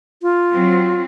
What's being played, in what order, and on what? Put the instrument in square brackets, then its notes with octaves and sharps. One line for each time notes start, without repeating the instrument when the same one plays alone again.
[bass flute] F4
[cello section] F#3 C4